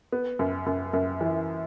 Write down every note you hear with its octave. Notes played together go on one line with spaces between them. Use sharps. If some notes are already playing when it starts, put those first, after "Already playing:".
B3
F#2
F#2
F#2
E3